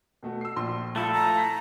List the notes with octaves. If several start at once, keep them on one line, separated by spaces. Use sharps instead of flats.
B2 A3 F#4
E6 C7
A#1 C6
A3 E4 F4 A4
A#5
B6